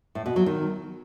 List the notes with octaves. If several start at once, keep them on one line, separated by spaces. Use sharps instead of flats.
A2
B2
F#3
D#3